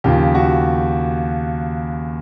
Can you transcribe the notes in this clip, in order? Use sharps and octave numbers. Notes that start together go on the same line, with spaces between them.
D#2 C#3 F3 G4
F#4